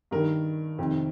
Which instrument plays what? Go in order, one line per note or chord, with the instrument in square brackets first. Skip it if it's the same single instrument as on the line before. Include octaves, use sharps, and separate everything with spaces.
[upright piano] G2 D#3 A#4
F2 C3 D#3